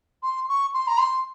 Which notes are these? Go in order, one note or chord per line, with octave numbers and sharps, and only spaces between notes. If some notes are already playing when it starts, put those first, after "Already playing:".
C6
C#6
C6
A#5
C6